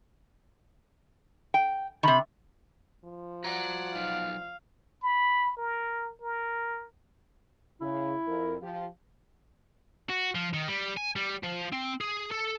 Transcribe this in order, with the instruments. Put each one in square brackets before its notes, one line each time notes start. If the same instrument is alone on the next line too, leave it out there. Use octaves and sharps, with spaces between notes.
[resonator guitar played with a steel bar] G5
[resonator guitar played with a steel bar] C3 D#3 [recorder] B5
[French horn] F3
[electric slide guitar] F#4 A#5 [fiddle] D5 F#5
[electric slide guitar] F#3 D#4 [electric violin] F5
[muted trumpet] B5
A#4
A#4
[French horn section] C#3 [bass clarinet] E4
[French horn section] F2 A#4
F3 F4 G4
[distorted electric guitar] F#4
F3
D#3
G3
G#5
G3
F3
C4
G#4
A4